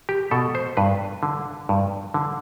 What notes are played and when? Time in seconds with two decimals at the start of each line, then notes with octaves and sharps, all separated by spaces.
0.09 G4
0.31 B2 A4
0.55 C5
0.77 G2 B4
1.23 D3
1.69 G2
2.14 D3